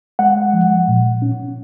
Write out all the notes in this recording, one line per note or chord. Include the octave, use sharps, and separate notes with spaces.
G#3 F#5
F3
A#2
C#4